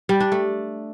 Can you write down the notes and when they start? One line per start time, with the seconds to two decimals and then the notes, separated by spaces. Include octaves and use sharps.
0.09 G3
0.20 D4
0.32 A3